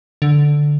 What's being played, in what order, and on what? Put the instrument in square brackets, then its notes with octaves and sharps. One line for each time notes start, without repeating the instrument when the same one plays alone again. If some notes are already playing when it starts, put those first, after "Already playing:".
[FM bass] D3